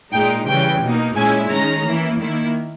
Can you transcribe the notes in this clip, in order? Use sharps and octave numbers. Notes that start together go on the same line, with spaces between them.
A#2 G#3 D#4 G5
C#3 E3 G3 C#4 G5
B2 A#3 D#4
A#2 G#3 C#4 E4 G#5
D#3 G#3 C#4 A#5
E3 A#3 E4
D#3 A#3 E4